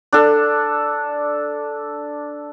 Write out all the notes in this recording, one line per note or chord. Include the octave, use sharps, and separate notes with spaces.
D4 A4